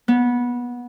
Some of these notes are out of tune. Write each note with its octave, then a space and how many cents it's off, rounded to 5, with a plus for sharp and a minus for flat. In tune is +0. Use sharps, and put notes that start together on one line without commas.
B3 -20